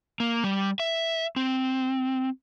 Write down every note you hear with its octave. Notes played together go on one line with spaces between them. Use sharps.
A#3
G3
E5
C4